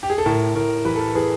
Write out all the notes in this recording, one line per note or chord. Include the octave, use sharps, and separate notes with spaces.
G4
G#4
A4
A2 A#4
A2 A#4
E3 B4
A4
A#4
E3 G#4